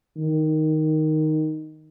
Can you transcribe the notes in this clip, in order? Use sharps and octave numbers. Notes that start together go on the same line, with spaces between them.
D#3